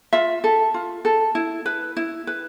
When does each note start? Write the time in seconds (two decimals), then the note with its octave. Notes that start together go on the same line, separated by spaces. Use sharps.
0.13 F4 E5
0.44 A4
0.74 F4
1.05 A4
1.35 E4
1.66 B4
1.97 E4
2.27 B4